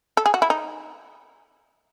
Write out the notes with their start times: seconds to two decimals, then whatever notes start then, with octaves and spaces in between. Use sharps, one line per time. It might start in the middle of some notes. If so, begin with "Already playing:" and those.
0.17 A4
0.26 G#4
0.34 F#4
0.42 E4
0.50 D#4